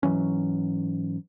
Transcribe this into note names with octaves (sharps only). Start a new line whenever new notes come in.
G#2 E3 F#3 C#4